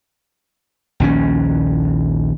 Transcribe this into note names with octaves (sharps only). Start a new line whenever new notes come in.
A#1 D#2 C#3 C#4